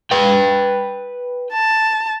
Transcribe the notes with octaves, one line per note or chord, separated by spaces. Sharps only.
B4 G5
A5